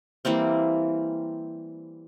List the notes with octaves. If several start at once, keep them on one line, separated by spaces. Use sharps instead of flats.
E3 G3 A#3 C4